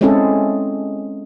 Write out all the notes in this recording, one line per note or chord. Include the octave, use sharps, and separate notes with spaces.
G#3 C4 C#4 E4 G#4 A4